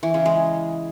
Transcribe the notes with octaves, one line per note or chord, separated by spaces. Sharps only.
E3
C#3
G#3